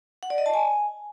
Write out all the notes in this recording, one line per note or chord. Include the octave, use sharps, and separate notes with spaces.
F#5
D5
D#5
A5
G#5